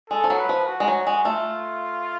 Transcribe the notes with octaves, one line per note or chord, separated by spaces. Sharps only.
G#3 A4
F3
F#3
B4
F3
F#4
G#3
F#3
G#3
A3 F4